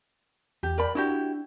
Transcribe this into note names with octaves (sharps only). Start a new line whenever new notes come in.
E2 G4
A#4 D5 B5
D4 E4 F#4 G4